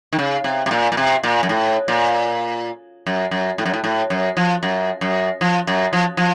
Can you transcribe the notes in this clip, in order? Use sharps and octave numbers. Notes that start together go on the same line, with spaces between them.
D#3
C#3
C3
C3
A#2
A#2
C3
A#2
F#2
A2
A#2
F#2
F#2
A2
F#2
A2
A2
F#2
F3
F#2
F#2
F3
F#2
F3
F3